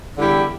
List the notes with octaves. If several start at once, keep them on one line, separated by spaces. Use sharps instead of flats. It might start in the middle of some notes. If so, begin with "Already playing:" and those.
E2 D3 G3 E4 G4